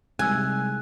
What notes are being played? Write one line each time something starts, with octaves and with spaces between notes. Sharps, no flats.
C3 G3 G#3 D#4 E4 G#5 E6 F#6